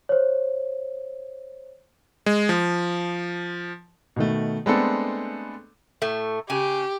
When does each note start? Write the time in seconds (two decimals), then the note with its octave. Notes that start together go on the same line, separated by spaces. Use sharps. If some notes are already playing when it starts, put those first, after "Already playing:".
0.09 C5 C#5
2.26 G#3
2.49 F3
4.16 B2 D#3 A3
4.66 G#3 A3 B3 C4 D4 A4
6.02 A2 A3
6.50 C#3 G4 G#5